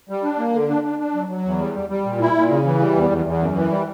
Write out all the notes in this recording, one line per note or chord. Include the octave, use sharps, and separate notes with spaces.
G3
D4
A#3
D3
D4
D4
D4
F#3
F#3
E2
G3
G3
G3
A#2
E4
A#2
C#3
E3
G3
E2
E2
E2
F#2
E3
G3